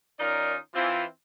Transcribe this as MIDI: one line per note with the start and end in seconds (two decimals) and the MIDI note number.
0.19 0.55 51
0.19 0.55 61
0.19 0.55 63
0.19 0.55 65
0.19 0.55 70
0.19 0.55 74
0.74 1.04 52
0.74 1.04 60
0.74 1.04 65